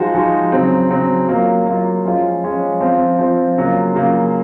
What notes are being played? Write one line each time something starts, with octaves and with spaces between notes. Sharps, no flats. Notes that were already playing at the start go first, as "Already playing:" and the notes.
Already playing: F3 G#3 D#4 F#4
F3 G#3 D#4 F#4
C#3 F#3 C4
C#3 F#3 C4
F#3 A#3 F4
F#3 A#3 F4
F3 G#3 C#4 F4
F3 G#3 C#4 F4
F3 C4 F4
F3 C4 F4
C#3 F#3 A#3 F4
C#3 F#3 A#3 F4